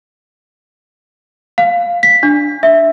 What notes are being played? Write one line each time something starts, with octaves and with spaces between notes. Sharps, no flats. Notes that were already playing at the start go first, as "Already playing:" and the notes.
F5
B6
D4
E5